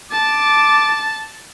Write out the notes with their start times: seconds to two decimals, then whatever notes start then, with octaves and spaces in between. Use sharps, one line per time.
0.12 A5 D6